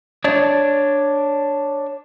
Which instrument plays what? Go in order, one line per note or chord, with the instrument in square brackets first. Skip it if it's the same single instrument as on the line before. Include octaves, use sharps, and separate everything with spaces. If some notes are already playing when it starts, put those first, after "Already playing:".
[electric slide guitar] D4 C#5 D5